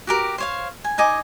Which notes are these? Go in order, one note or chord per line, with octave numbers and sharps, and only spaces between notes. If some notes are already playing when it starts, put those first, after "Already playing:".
F#4 G4 A#4
C5 C#5 F5
G#5
D#4 D#5 G#5 D6